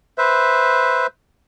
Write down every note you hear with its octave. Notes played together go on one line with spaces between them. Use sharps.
B4 C5 E5